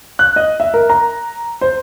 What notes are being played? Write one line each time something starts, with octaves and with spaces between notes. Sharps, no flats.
F#6
D#5
E5
A#4
A#5
C5